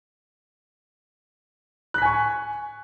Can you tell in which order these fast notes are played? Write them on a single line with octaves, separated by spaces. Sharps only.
F#6 B6 G#5 C#6